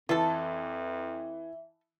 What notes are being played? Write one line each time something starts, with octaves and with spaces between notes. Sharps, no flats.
F2 E3 F4 A4 E5